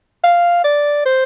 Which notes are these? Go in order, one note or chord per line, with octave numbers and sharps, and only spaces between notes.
F5
D5
C5